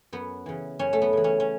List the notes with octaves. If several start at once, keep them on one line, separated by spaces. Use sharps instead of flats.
F#2 B3
C#3 E3
F#2 C#4
A3
B3
C#3 E3
C#4
C#4